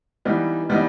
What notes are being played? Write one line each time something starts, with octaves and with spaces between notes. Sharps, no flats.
E3 G3 B3 D#4
E3 G3 B3 D#4